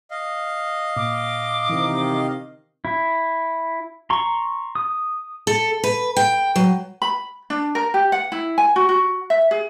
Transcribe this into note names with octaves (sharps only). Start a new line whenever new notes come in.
D#5 F5
A#2 D6
C3 D#3 E3
E4
A#5 C6 C#6
D#6
A4
B4
G5
F#3
B5
D4
A#4
G4
F#5
E4
G#5
F#4
F#4
E5
G#4